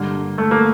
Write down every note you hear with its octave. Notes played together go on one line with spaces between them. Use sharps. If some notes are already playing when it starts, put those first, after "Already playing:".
Already playing: G2 D3 A#3
A3
A#3